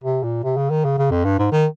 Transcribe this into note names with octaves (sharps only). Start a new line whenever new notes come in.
C3
A#2
C3
C#3
D#3
C#3
C#3
F2
G2
G#2
D#3